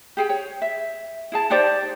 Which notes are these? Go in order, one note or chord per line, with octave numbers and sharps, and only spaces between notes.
G4 G#4 G5
C#5
E5
E4 G#4 A5
D#4 G4 C5 D5